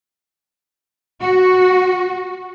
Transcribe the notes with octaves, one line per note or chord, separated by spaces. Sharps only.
F#4